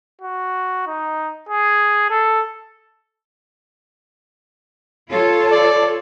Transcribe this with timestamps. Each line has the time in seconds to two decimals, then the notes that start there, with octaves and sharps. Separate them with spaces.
0.21 F#4
0.87 D#4
1.49 G#4
2.10 A4
5.10 F4 A4 C#5
5.52 D5